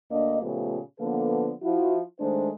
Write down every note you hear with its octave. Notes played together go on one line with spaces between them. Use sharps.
D2 A#3 D4 D#5
A#2 C#3 F3 A3 B3 G4
D3 F3 A#3 B3 A4 B4
F3 E4 F#4
D#3 G#3 A3 D4 C5